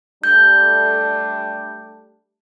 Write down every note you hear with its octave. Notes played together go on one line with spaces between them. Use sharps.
G3 A3 D4 G6